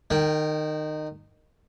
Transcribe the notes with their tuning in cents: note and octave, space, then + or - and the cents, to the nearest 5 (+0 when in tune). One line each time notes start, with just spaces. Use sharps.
D#3 -20 G5 +0